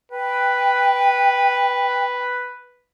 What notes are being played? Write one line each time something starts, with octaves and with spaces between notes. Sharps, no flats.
B4 G5